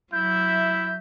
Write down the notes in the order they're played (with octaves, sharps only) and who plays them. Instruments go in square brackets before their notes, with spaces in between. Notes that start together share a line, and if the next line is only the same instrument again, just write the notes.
[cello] F#3 E5 [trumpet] E4 [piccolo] G6